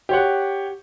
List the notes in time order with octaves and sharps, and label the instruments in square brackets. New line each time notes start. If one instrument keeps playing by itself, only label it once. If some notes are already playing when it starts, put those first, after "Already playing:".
[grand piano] G4 C#5 F#5